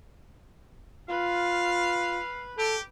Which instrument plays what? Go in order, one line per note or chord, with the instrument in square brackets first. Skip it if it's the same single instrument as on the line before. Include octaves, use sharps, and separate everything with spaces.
[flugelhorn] F4 [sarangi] B4 [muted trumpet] F5
[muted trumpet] G4 [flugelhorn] A4